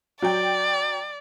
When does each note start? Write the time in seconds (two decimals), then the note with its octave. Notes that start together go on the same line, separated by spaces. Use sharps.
0.22 F#3 D5 G5